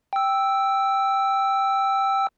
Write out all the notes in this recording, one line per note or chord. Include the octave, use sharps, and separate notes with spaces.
G5 E6